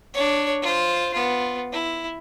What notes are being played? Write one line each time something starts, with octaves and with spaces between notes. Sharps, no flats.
D4 C#5
F4 C5
B3 F4
E4